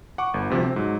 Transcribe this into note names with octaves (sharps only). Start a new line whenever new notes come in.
F#5 C#6 D6
G1
D2 C3 F3 G3
C4
G#2 F#3